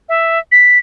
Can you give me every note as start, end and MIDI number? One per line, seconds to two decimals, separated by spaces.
0.09 0.39 76
0.52 0.79 95